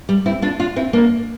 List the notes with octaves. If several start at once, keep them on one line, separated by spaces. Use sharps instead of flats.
G3
C4 E4
D4 F4
D4 F4
C4 E4
A#3 D4